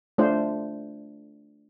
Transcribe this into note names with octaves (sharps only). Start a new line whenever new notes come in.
A3 D4 F4 C5